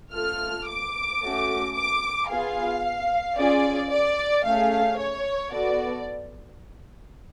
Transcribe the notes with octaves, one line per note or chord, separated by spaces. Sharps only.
A3 F4 A4 F6
D6
A3 C#4 F#4 A4
D6
B3 F4 G#4 F5
C#4 F4 G#4 D5
D5
A3 C#4 G#4 F5
C#5
B3 F#4 A4 D5